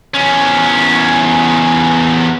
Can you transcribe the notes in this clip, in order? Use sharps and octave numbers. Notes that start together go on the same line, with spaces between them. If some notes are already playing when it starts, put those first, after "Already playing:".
E2 C#4